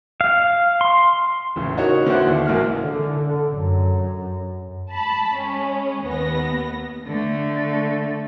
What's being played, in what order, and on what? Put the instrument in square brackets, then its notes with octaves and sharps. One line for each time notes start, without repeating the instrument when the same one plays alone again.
[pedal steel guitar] F5
C6
[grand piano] E1 A2 C#3
D#4 F#4 A#4 C#5
D3 B3 D4 E4 F#4 C5
D#2 E5
A1 G#3 A#3 F#4 F6
[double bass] D3
F#2
[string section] A5 B5
G#3 C#4
D#2 B3 A#6
[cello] D3 A3